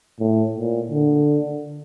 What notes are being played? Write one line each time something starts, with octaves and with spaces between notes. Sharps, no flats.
A2
A#2
D3